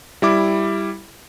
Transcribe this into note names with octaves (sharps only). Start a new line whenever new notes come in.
G3 E4 D6